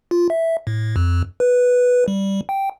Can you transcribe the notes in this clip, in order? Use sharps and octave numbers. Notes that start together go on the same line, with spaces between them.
F4
E5
A2
F2
B4
G3
G5